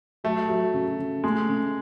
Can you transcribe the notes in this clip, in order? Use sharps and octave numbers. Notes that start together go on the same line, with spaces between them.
F#3 A3
F#3
C#3
C#3
G#3 A3
C#3